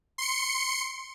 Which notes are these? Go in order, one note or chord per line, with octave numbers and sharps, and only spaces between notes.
C6 C#7